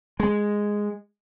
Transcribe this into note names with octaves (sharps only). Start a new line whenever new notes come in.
G#3